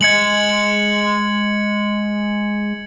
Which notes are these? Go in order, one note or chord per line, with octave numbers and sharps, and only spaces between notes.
G#3 D#5 G#6 C#7 F#7